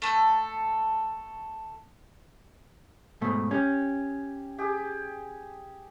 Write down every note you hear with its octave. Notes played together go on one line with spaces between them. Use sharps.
A3 A4
G#2 B2 A3
C#4 G4 D#6
G4 G#4